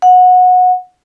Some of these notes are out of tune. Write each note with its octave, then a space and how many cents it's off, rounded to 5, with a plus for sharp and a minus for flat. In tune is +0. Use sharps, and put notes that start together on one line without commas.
F#5 -20